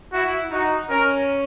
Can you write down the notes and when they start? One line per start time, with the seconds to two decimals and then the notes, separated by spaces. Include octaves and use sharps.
0.13 E4 F#4
0.51 D#4 F#4
0.90 C#4 A#4